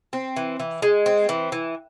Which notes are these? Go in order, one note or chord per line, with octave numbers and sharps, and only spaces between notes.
C4
E3
E3
G#3
C4
E3
E3